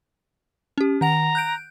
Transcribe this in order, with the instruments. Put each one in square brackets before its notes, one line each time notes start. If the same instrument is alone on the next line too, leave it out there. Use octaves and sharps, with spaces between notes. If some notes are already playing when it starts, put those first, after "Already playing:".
[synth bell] C#4 G4
[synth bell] D#3 F#5 F7 [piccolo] A#5
[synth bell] F#6 G6 D7